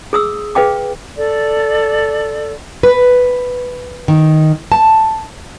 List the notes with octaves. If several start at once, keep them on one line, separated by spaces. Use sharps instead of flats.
G#4 D#6 E6
G#4 B4 F5 G5 D6
A4 D5
B4
D#3
A5